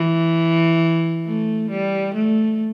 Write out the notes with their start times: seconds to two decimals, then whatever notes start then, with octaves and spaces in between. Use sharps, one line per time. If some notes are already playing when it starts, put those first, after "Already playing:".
Already playing: E3
1.26 A3
1.71 G3
2.14 A3